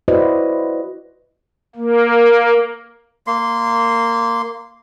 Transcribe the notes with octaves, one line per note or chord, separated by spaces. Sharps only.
E4 F#4 B4 C5 D5 D#5
A#3
A#3 C6